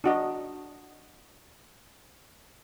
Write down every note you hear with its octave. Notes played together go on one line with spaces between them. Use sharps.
D4 F#4 D#5